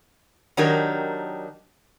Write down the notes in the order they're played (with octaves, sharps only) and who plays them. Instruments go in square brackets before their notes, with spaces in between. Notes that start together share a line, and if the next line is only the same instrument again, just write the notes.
[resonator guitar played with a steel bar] D#3 F#3 D4 D#4 G4 A#4